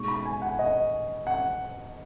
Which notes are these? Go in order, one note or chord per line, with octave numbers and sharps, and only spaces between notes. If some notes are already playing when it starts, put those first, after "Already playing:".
Already playing: B2 G#3 D#4 C#6
B5
G#5
F#5
D#5
F#5